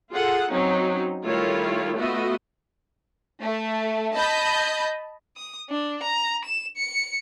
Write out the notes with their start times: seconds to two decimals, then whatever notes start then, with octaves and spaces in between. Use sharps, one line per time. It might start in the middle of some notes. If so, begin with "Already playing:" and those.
0.11 F4 G#4 A4 F#5
0.50 F#3 C4 C#4 D#4
1.25 D#3 G3 A3 E4 F4 C#5
1.94 A3 B3 F4 F#4 D#5 E5
3.42 A3
4.14 D#5 A5 B5 G6
5.37 D#6
5.69 D4
6.03 A#5
6.45 E7
6.76 C#7